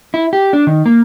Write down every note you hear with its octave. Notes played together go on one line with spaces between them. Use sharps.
E4
G4
D4
D#3
A#3